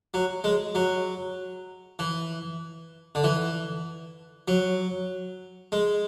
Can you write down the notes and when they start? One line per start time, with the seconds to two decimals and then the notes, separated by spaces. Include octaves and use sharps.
0.14 F#3
0.44 G#3
0.75 F#3
1.99 E3
3.15 D3
3.24 E3
4.48 F#3
5.72 G#3